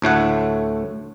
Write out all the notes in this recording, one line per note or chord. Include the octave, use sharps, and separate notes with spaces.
D2 A2 A3 F#5